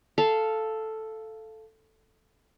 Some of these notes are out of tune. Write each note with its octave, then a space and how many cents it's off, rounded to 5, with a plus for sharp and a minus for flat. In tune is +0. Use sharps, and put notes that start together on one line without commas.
A4 +0 F5 -10